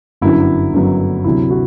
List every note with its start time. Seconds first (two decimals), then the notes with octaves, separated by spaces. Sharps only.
0.21 G1 F#2 D3 F#3 E4
0.74 G1 F#2 D3 F#3
1.24 D2 C3 F#3 E4
1.50 F#4